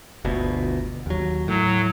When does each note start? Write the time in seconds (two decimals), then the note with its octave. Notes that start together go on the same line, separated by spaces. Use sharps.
0.25 G1 D2 B2
1.06 D#2 F#3
1.48 A2 F#3